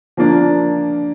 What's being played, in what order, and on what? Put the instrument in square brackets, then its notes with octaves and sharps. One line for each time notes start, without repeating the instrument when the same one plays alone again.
[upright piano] F3 A#3 D4